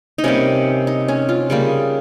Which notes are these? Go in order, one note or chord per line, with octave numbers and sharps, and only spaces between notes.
D#4
C3 G3 A#3 C#4
D#4
C#4
F4
C#3 G3 A#3